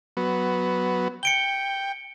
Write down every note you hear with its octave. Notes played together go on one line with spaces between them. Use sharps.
F#3 B3
G5 C#7 D7 G7